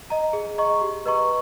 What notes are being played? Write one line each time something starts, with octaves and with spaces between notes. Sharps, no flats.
D#5 A#5
G#4
D#5 A#5 C#6
G4
B4 D#5 A#5 C#6